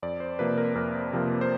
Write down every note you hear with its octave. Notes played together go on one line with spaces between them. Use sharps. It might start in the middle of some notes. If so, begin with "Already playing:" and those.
F2 D5
C5
C3 F3 A#3 B4
A#4
F2 A#4
C3 F3 A#3
C5